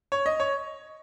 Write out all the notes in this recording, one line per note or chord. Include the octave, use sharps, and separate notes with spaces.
C#5
D#5
C#5